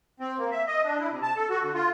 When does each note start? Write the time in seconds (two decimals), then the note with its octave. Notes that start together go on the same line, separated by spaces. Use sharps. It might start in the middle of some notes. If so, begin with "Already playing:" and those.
0.20 C4
0.38 A#3
0.52 E5
0.67 D#5
0.84 D4
0.99 E4
1.11 C3
1.23 A5
1.36 A4
1.50 F#4
1.62 D3
1.74 F4